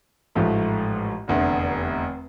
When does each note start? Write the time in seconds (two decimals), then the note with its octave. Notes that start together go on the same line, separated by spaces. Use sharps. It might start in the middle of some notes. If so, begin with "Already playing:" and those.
0.35 A1 G#2 F3 A3
1.28 F1 E2 D3